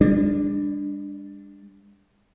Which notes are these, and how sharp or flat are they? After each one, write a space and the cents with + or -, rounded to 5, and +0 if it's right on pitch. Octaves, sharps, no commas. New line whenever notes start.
G#3 -45 D4 +0